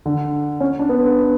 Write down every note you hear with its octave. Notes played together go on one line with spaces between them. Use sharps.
D3
C#4
D4
B3